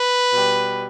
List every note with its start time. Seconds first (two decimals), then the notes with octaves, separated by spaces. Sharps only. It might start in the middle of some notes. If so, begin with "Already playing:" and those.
Already playing: B4
0.31 B2 G3